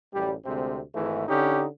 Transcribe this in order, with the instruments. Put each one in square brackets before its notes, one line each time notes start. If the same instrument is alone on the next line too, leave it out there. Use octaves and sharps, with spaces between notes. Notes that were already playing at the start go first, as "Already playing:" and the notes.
[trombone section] A1 F#2 G3
D2 C3 G#3 C4
G#1 G#2 E3 A3
D3 C#4 D#4 G4